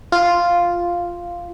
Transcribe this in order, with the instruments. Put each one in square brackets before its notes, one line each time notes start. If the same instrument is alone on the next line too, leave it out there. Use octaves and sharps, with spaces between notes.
[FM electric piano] F4